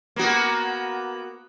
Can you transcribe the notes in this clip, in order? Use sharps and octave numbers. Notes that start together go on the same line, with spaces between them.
A#3 B3 F#4